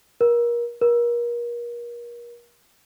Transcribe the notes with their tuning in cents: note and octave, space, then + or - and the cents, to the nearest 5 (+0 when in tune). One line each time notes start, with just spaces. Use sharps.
A#4 +30
A#4 +35